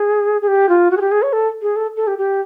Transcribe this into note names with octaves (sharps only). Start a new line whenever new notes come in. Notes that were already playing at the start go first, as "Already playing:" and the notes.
Already playing: G#4
G#4
G4
F4
F#4
G#4
G4
G#4
C#5
A4
G#4
A4
A4
G4
G4